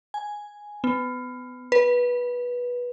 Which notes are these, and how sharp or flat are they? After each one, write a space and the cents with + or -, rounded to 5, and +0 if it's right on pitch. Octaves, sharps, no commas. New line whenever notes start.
G#5 +0
B3 +25
B4 -15